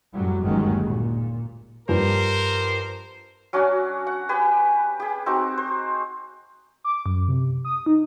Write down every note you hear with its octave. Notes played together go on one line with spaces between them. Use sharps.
F#2 A2 F#3 G3
G1 D#2 D#3 F#3 G#3 C#4
A#2
G2 F3 A#4 C5
F#3 C#4 D4 F#4
F#5
G4 B4 G#5
G4 G#4
C4 D#4 F#4
C5
D6
F#2
C3
D#6
D#4